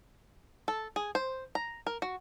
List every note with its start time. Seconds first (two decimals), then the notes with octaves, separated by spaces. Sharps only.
0.68 A4
0.96 G#4
1.15 C5
1.55 A#5
1.86 A#4
2.02 F#4